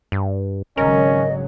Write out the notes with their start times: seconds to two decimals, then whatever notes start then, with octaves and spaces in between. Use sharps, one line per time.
0.12 G2
0.77 G#1 C#3 F#3 C#4 A#4 D#5